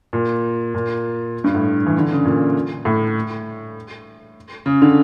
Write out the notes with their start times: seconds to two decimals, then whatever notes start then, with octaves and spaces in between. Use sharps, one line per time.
0.13 A#2
0.74 A#2
1.44 G2
1.55 A2
1.86 E3
1.98 D3
2.12 C#3
2.25 A#2
2.85 A2
4.66 C#3
4.82 D3